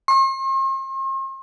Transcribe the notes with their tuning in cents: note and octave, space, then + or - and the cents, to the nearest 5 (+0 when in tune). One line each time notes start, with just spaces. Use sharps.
C6 +45